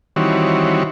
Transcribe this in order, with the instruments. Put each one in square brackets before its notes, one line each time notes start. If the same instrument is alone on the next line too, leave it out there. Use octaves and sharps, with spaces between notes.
[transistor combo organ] D#3 E3 G3 C4 F#4 C#5